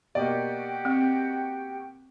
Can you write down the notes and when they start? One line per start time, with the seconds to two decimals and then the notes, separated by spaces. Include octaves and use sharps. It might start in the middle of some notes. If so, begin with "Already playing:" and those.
0.15 B2 A#3 F#4 G4 D5 D#5 G5
0.85 C4